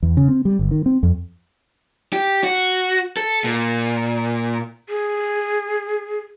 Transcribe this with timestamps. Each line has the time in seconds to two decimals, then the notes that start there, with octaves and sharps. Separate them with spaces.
0.03 E2
0.17 C#3
0.28 C4
0.45 G3
0.59 G1
0.71 D#3
0.86 C4
1.03 F2
2.13 G4
2.44 F#4
3.17 A4
3.44 A#2
4.89 G#4